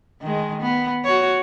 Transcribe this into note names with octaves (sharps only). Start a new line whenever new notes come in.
D#3 G#3
B3
F#4 C#5